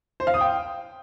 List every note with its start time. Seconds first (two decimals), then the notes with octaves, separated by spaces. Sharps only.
0.20 C5
0.27 F5
0.34 D#6
0.41 G5